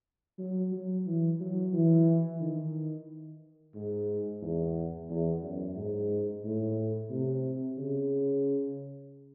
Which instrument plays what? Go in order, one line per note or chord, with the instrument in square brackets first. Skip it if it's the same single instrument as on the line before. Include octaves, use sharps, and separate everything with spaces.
[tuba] F#3
F#3
E3
F#3
E3
D#3
G#2
E2
E2
F#2
G#2
A2
C3
C#3